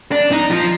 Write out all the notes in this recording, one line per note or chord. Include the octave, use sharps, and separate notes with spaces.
D4
D#4
F3